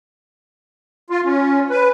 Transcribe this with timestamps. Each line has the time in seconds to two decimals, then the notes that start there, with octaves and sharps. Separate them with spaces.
1.10 F4
1.25 C#4
1.70 B4